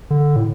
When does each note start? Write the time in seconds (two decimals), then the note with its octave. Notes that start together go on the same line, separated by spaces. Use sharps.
0.10 D3
0.36 A2